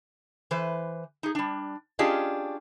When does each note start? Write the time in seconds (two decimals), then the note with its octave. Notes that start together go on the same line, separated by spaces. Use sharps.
0.51 E3 B4 C5
1.23 D#4 G#4
1.35 G3 D4
1.99 C#4 D4 F4 G4 G#4 D#5